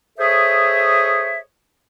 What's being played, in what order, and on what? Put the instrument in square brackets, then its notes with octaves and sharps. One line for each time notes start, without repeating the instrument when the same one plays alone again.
[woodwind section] G#4 A4 C5 C#5 D#5 E5